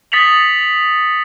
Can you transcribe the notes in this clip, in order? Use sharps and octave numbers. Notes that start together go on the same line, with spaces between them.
D#6 A6 B6 C#7 F7 F#7